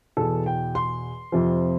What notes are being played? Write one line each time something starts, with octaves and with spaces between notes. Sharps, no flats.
E2 B2 A4
G5
C6
F2 C3 F3